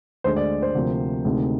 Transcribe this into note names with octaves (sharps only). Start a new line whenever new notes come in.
D2 D3 G#3 C5
D5
C5
D2 C3 F3 A#3
D2 C3 D#3 G#3